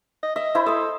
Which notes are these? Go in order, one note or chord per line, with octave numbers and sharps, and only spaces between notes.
D#5
D#5 E5
E4 C5 B5
A4 C5 D#5